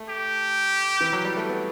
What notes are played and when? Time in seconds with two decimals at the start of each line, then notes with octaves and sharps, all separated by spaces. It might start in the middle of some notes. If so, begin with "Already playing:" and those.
Already playing: A3
0.09 G4
1.01 E3
1.13 F#3
1.25 G3
1.37 A3
1.49 B3